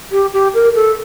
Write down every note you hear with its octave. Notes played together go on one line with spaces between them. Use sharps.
G4
G4
A#4
A4